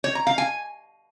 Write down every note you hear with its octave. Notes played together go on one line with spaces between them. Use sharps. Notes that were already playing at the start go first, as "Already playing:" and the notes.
C#5
A#5
F5
G#5